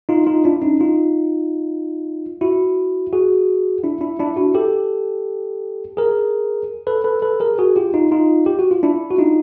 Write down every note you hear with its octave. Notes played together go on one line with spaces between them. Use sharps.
D#4 F4
D#4 F4
D4 E4
C#4 D#4
D#4 F4
E4 F#4
F#4 G#4
D4 E4
D4 E4
D4 E4
E4 F#4
G4 A4
G#4 A#4
A4 B4
A4 B4
A4 B4
G#4 A#4
F#4 G#4
F4 G4
D#4 F4
D#4 F4
G4
F#4
F4
D4 E4
F#4
D#4 F4